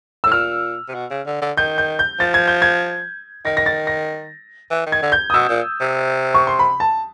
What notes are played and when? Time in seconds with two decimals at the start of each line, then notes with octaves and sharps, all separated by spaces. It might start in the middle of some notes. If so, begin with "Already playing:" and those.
0.24 A2 E6
0.32 A#2 F6
0.88 C3
0.95 B2
1.10 C#3
1.27 D3
1.41 D3
1.57 D#3 G6
1.78 G6
1.99 G6
2.20 F3 A6
2.34 G#6
2.48 G6
2.62 G#6
3.45 D#3 A#6
3.57 A#6
3.66 A6
3.87 A#6
4.71 E3
4.86 D#3
4.92 G#6
5.02 D3
5.12 G6
5.30 D#6
5.34 B2 E6
5.49 A#2
5.81 C3
6.34 C#6
6.47 C6
6.59 B5
6.80 A5